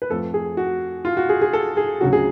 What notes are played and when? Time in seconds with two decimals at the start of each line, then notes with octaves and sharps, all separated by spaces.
0.02 B4
0.10 F2 F3 A3 A4
0.34 G#4
0.57 F#4
1.05 F4
1.17 F#4
1.29 G#4
1.41 G#4
1.53 A4
1.77 G#4
2.01 D2 C#3 F#3 F#4
2.13 G#4